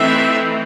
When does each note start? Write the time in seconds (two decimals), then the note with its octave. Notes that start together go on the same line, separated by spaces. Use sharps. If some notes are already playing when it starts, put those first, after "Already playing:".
Already playing: E3 A3 C4 D#4 E5